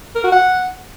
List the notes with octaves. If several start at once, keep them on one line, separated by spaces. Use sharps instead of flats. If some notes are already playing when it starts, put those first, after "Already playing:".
A#4
F#4
F#5